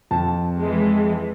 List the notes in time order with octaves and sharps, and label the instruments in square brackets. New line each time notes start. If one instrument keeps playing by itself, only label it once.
[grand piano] F2 A5
[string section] E3 G#3